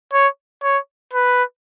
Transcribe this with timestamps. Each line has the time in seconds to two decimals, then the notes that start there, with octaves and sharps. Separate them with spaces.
0.13 C#5
0.63 C#5
1.14 B4